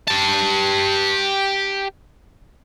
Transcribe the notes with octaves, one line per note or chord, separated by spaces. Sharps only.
G4 A5